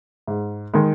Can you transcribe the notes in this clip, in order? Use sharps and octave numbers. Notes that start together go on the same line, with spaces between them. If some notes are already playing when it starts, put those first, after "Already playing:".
G#2
D#3 G#3